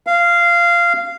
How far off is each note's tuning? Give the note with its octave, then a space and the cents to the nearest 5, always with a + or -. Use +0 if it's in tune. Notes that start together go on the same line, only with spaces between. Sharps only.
F5 -15